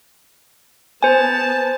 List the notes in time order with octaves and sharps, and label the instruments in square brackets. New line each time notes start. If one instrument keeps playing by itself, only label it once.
[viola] B3 A5 [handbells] C5 G#5